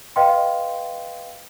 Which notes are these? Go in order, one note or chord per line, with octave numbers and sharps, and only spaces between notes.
B4 D#5 F5 G5 C6